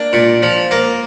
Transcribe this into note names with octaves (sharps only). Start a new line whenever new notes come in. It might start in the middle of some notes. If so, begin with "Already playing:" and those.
Already playing: A#3 D4
A#2
F3
A#3